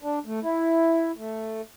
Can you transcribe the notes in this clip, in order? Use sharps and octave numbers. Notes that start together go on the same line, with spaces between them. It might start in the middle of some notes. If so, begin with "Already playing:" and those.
D4
A3
E4
A3